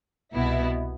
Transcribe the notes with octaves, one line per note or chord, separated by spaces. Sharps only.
C2 B2 B3 E4